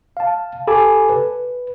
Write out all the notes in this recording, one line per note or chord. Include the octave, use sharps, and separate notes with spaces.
F5 A5
G4 A4 G#5 A5 B5 D6
B4